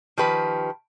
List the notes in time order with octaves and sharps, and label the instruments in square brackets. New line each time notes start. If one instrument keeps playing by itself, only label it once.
[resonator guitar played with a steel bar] D#3 F3 G4 B4